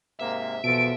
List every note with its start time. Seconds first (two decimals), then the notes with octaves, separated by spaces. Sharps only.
0.19 G#2 C3 A#3 E5
0.64 E2 B2 F3 A4 D7